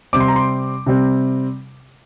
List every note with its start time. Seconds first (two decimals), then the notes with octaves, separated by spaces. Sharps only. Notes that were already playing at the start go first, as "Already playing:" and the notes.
0.13 C3 G3 C4 D6
0.20 C6
0.28 A#5
0.36 C6
0.86 C3 G3 C4